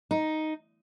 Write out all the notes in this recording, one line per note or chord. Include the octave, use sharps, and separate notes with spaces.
D#4